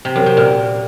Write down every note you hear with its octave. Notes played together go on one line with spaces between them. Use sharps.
C3
F#2
C3
A#2